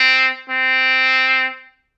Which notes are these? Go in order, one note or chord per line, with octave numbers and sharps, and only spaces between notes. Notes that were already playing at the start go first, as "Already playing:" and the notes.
Already playing: C4
C4